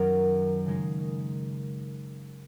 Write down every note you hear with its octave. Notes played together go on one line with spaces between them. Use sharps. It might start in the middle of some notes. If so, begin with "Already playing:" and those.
Already playing: F#2 D#3 F#3 C#4 A#4
C#3 G#3 D#4